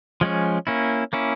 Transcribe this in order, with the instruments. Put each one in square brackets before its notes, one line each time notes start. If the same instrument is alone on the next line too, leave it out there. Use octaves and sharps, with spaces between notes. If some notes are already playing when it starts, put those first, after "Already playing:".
[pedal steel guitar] F3 G#3 C#4
A#3 C#4 E4
A#3 C#4 E4